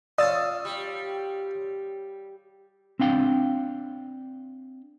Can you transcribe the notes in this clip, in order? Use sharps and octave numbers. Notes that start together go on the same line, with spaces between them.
C#4 F4 D5 D#6 E6 A6
G3
C4 D4 F5 G5